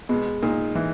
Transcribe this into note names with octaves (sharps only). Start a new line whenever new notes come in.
B2 G#3
A#2 D#4
E3